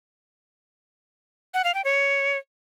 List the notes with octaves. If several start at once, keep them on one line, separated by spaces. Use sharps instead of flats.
F#5
F5
G5
C#5